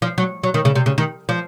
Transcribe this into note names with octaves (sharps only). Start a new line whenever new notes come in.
F3
F#3
F#3
D#3
C#3
C3
C#3
D#3
F3